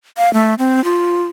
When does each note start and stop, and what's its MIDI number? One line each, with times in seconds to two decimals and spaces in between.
0.17 0.32 77
0.33 0.55 57
0.59 0.83 60
0.84 1.26 65